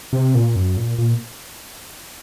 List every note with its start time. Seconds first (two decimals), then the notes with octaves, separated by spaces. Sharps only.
0.13 C3
0.35 A#2
0.56 F#2
0.77 A#2
0.98 A#2